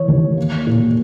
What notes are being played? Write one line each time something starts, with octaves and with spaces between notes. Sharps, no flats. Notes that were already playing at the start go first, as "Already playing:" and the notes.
Already playing: E3 C#5
D#2
A#3
A#2